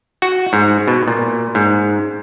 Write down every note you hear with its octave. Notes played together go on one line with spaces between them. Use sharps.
F#4
G#2
B2
A#2
G#2